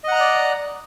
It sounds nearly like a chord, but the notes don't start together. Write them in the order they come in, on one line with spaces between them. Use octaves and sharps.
D#5 F#5 A#5 F#6 D5